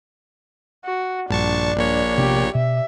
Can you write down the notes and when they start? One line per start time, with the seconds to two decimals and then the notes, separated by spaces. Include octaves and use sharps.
0.85 F#4
1.30 A#1 G2 D4 A5 C#6
1.77 A#1 A#2 C#5
2.18 C3 B3 D4 G4
2.55 B2 E5